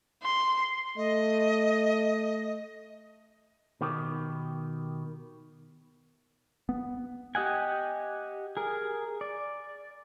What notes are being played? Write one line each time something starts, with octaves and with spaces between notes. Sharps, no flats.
C6
A3 D#5
B2 D#3 G4
B3
G4 D#5 F#5 G#5
G#4 A#4
D5